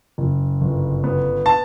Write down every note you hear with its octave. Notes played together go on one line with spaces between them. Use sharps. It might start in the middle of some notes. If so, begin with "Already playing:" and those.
F#1
G1
B3
A5